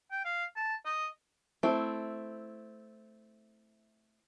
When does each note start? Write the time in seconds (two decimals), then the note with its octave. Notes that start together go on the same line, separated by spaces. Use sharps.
0.11 G5
0.25 F5
0.56 A5
0.85 D#5
1.63 A3 C4 E4